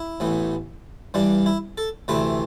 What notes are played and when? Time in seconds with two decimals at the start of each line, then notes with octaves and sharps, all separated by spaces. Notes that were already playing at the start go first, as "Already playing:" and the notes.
Already playing: E4
0.20 A1 A2 E3 B3
1.14 G2 E3 G3 D4
1.46 E4
1.78 A4
2.08 D2 C3 E3 A3 C4 B4